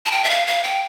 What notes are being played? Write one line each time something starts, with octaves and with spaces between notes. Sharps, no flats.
A5
G5
E5
F5
F5
G5